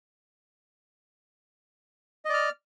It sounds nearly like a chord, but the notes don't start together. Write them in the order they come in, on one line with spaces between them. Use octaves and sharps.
D#5 D5 F6